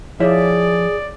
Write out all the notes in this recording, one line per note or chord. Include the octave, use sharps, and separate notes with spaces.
F3 E4 G#4 C#5 D5 E5 F5 D6